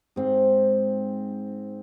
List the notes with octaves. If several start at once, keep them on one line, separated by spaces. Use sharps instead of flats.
G#2 C4